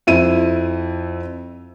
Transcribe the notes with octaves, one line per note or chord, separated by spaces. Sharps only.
F2 E4 D#7